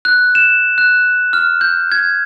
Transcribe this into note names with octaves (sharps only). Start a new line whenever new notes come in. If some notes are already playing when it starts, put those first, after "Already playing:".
F#6
E7
F#6
F6
G6
G#6